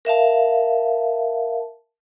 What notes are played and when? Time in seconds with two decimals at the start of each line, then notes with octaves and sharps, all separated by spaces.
0.05 A#4 E5 F5 A5